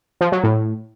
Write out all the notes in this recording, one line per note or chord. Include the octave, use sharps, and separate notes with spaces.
F3
F#3
A2